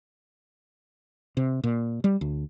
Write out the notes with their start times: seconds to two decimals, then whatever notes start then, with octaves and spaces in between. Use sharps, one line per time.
1.37 C3
1.64 A#2
2.04 G3
2.21 D2